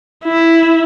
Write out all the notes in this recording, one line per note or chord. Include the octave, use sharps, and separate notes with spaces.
E4